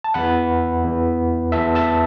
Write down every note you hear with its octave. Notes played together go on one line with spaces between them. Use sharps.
A5
E2 E3 F#5 B5
E2 E3
E2 E3 E5 A5
E5 A5